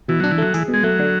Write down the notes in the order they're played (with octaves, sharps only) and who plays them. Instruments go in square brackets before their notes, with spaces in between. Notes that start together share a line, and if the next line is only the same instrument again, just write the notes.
[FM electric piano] B2 [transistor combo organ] E3
[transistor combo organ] F#3 [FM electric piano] D4
[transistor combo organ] E3
[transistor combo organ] F#3 [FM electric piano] A3
[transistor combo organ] E3 [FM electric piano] G#4
[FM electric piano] B2
[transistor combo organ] G#3
[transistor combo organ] F#3 [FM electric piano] A3
[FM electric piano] D3